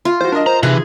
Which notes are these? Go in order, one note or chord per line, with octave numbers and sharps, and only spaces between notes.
F4
E3 F#4 C5
D4 A#4 D#5
C5 A#5
C3 D#3 E3 G#4 F#6